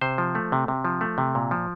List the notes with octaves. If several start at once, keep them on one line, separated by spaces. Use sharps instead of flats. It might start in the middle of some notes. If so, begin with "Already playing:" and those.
C3 C5
F3
A3
C3
C3
F3
A3
C3
A#2
F3